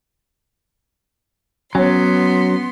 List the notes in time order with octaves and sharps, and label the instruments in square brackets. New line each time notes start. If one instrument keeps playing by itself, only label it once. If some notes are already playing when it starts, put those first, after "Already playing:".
[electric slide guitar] F#3 [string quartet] B3 C6 [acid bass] C#4